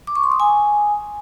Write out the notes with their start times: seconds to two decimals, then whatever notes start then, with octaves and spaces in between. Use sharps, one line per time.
0.07 D6
0.15 C#6
0.24 C6
0.32 D#6
0.40 G#5